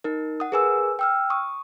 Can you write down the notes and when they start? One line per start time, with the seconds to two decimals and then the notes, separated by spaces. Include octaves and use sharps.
0.04 D#4 A#4
0.40 F#5 D#6
0.52 G#4 A#4 B4 G#5 E6
0.99 G5 E6 F6
1.30 C#6 D#6